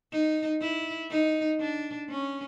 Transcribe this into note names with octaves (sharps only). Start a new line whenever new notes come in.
D#4
E4
D#4
D4
C#4